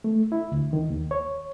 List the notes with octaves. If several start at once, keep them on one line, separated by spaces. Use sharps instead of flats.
A3
E4
D2
D#3
D#2
C#5